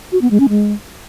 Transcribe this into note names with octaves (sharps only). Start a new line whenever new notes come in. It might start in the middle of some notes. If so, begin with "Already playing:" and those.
F#4
B3
G#3
C#4
G#3